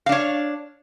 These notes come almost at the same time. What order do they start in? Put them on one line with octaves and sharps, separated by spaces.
F5 D4 C#5